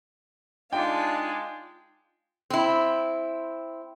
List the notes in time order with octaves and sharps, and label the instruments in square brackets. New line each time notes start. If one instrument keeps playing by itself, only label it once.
[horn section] G#3 D4 [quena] D#4 [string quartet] F4 [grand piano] G5
[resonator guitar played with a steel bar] C4 E4